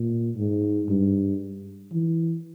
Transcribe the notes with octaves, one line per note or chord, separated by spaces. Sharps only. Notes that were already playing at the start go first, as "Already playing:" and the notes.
Already playing: A#2
G#2
G2
E3